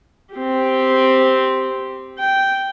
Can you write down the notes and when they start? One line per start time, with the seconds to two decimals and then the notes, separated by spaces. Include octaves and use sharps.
0.34 C4 G4
2.18 G5